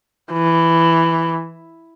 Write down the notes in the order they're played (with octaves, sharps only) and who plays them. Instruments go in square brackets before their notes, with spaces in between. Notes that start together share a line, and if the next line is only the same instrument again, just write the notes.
[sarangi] E3